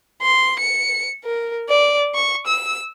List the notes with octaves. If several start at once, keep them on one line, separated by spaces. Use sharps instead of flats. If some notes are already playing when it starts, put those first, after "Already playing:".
C6
C#7
A#4
D5
C#6
E6